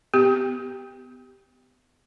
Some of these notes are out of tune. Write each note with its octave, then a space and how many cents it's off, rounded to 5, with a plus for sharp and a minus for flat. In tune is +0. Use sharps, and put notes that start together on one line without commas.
B3 +30 G4 +0